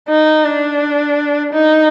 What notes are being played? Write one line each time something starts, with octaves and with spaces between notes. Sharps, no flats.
D#4
D4
D#4